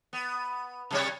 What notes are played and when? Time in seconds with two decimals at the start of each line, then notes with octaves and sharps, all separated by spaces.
0.13 B3
0.91 C3 G3 C#5